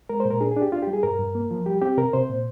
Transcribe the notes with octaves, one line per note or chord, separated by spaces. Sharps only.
G#3 A#4
C5
A#2
A#4
D4 G#4
G#4
D4
G4
D4 F4
G3 G4
G#4
G2 A#4
G2
A#3
F3
G3 G4
C4 G4
C3 A#4
C3 C5
A#2